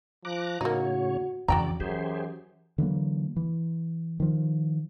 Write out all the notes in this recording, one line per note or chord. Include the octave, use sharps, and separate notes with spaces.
F3 A#5 D6 F#6
A2 C#3 A#3 D#4 F#4 C#5
F2 C#3 E3 F#4 D5 G5 A#5
F#2 E3 G4 G#4 C5
D3 E3 F#3 A#3
E3
D#3 F3